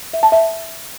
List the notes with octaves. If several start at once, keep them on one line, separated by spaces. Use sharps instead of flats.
E5
A5
E5